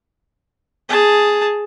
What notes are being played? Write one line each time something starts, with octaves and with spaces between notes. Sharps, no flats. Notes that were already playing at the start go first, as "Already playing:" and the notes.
G#4 A5